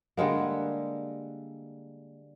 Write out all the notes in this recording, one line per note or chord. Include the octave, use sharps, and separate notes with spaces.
D3 G3 G#3 A#3